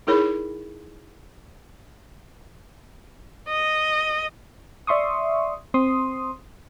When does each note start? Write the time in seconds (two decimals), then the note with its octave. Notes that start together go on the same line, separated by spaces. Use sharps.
0.07 D#4 E4 G#4 A#4 C#5 B5
3.48 D#5
4.87 D5 E5 C6 C#6 D#6
5.74 C4 C6 D#6